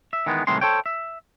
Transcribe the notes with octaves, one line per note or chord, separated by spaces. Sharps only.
E5
D#3 E3 G#3 B3
C2 A2 D#3 E3 G#3 C6
A4 C5 C#5 G5
E5